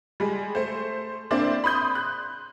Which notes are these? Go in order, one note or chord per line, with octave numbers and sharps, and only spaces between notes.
G3 G#3
A3 C5
A#3 C4 D4 E4 C5 D5
B5 C6 D#6 G6
F#6